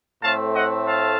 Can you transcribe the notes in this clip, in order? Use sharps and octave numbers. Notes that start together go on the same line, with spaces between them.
A2 A3 C4 F5 A5
D#5 F#5
F5 A5